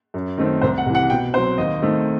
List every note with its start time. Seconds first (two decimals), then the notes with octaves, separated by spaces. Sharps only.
0.14 F#2
0.38 D#3 A3 C4
0.61 C2 C5
0.77 F#5
0.86 C3 E3
0.95 F#5
1.10 B2 G5
1.33 C4 C5
1.37 F#3
1.58 D#2 D#5
1.82 D#3 A3 C4